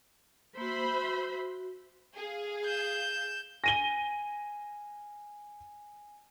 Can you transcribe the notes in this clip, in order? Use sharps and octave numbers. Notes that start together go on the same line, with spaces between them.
A#3 F#4 C5 E5 B5
F#4
G#4 F5
G6 E7
G#5 A#6 D#7 G7